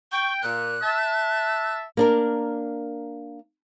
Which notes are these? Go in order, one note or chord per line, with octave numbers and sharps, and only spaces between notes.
G5 C#6
A#2 F#6
E5 A5
A#3 D4 A#4